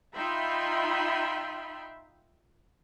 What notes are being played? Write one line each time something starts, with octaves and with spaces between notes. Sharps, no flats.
D#4 F4 E5 G5 B5 C6